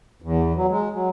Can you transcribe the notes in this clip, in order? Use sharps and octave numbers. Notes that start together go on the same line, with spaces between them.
E2
F#3
G#3
F#3